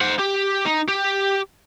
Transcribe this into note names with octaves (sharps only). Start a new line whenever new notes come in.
C5 F#5
G4
D#4
G4